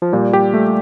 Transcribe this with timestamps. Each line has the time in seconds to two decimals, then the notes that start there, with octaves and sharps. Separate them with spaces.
0.02 F3
0.13 A#2 G3
0.33 G4
0.54 A3